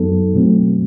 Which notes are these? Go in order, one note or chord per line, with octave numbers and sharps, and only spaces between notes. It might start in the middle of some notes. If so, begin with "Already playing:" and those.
Already playing: F#2 F#3 B3 D#4 A4
B2 F#3 A3 C4